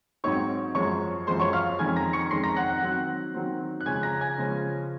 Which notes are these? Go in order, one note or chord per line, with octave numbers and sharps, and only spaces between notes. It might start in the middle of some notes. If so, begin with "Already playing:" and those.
G#2 F#3 C4 D#4 C#5 C#6
F#2 F3 G#3 C#5 C#6
F#2 F3 G#3 C5 C6
C#5 C#6
F5 F6
F2 D#3 G#3 C#4 G#5 G#6
A#5 A#6
C#6 C#7
F2 D#3 G#3 C#4 C6 C7
A#5 A#6
F#5 F#6
F#5 F#6
D#3 F#3 C4
D#3 F#3 C4
F#6
C#3 F3 G#3 C#4 G#5 G#6
A#5 A#6
G#5 G#6
C#3 F3 G#3 C#4